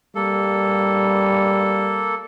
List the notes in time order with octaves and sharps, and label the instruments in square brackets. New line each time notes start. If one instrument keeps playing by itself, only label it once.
[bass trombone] G3 [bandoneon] A#3 A4